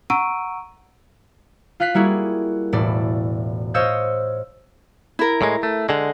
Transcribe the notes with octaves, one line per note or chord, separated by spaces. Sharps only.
F#5 A#5 C#6 E6 D7 D#7
F4 F5 F#6 B6 C7
G3 A#3 E4 F#4 G#4
E1 A2 E4 D5
C5 C#5 D#5 F5 E6 G6
E4 A#4
A2 G#3
A3
D3 G#3